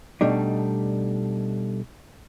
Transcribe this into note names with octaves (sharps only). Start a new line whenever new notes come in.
B2 G3 A3 D4 D#4